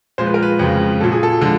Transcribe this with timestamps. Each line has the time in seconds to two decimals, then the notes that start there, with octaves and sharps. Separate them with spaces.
0.18 A#2 F3 G#3 C5
0.26 B4
0.34 A#4
0.42 B4
0.59 F2 C#3 F3 G#3
1.00 A#2 F#3 A4
1.12 G#4
1.23 A4
1.41 D3 F3 G#3